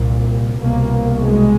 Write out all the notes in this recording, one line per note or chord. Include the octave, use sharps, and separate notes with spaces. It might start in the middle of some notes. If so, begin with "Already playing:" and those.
Already playing: C2 A#2
C2 B2 A#3
G#3